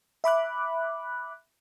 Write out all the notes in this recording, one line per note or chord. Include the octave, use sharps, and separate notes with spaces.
E5 B5 D6 F#6